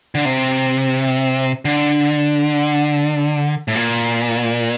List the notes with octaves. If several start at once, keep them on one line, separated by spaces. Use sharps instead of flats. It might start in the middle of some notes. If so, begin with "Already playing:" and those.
D3
C3
D3
A2
A#2